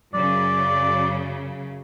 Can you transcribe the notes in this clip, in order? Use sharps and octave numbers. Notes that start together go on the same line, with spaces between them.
F#2 C#3 D5